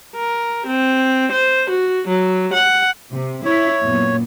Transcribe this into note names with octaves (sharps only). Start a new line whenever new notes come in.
A#4
C4
C5
F#4
F#3
F#5
C3
E4 C#5
F#2 A#2 B3